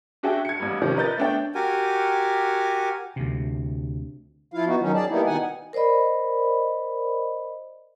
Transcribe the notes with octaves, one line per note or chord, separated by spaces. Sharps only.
D4 F#4 G#4 E5 G5 A5
G#6 C#7
A1 G2
C3 D#3 F3 C#4
A#4 B4 D#5 G6 A6
A3 B3 D4 C#5 G5
F#4 G4 A#4 G#5
D2 C3
F3 E4 F4 F5
B3 D#4 F#4
D#3 F#3 C#4 D#4
G#4 D5 A5
G3 A#3 B3 D#4 E4
B2 D#3 D#4 F#5 G#5
A#4 C5 D5 D#5 B5